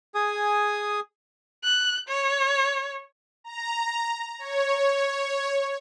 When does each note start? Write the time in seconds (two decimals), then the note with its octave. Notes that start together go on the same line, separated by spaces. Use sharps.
0.15 G#4 G#5 D#6
1.64 F#6
2.08 C#5
3.44 A#5
4.39 C#5